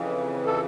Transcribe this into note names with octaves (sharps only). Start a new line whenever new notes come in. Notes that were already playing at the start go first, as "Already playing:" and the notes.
Already playing: F2 C#3 E3
A4